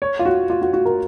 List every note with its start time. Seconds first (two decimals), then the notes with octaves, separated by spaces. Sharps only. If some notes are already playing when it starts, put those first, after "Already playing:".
0.02 C#5
0.19 F4
0.25 F#4
0.50 F4
0.62 F#4
0.73 F#4
0.85 A#4